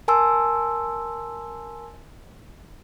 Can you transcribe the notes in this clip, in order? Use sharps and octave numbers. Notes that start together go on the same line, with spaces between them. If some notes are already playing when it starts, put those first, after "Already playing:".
A#4 G#5 A5 C6 E6